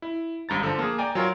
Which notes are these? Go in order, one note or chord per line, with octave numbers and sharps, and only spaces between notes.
E4
G#1 G2 A#5 A6
D3 F3
A#3 G#4
D5 G5 G#5 A#5
F#3 F4 A#4 C#5